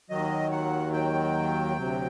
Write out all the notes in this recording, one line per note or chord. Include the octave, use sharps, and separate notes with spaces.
D#2 D#3 F#3 D#5
F#5
G5
D2 C3 F#3